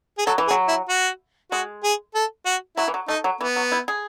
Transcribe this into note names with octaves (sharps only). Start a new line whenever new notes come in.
G#4
F#3 A4
E3
G#4
F#3
E4
F#4
G#3 F#4
G#4
A4
F#4
F#3 E4
E3
F#3
A3 D#4
F#3
E3 B3
F#3
E4
G#4